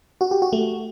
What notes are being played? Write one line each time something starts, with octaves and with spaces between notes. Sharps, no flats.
F#4
G4
F#4
A3